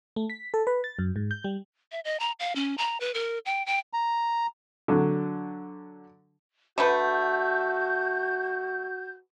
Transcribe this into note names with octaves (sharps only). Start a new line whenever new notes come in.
A3
B6
A4
B4
A6
F#2
G#2
G6
G3
E5
D#5
A#5
F5
C#4
A#5
B4
A#4
G5
G5
A#5
D3 F#3
D3 A3 F#4 B4 G6